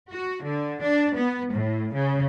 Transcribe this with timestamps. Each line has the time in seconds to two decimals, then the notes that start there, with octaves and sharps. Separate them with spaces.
0.10 F#4
0.43 D3
0.82 D4
1.15 B3
1.53 A2
1.93 C#3